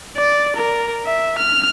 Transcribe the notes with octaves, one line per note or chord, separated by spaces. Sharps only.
D5
A#4
E5
F6